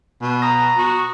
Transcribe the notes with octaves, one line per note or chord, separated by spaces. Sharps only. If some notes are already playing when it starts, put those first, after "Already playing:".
B2
A#5 D#6 A#6
F#4